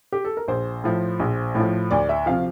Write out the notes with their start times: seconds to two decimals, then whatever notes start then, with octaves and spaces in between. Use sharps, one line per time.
0.12 G4
0.25 A4
0.37 A#4
0.48 A#1 C5
0.84 A2 F3
1.19 A#1
1.55 A2 F3
1.91 D2 D5
2.09 E5
2.26 C3 F3 F5